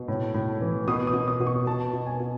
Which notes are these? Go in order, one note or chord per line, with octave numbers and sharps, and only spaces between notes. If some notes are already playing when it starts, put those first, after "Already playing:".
Already playing: B2
A2
A2
E3
B2 D#6
D#6
B2
D#6
B2
C#6
B2 A5
B2
G#5
B2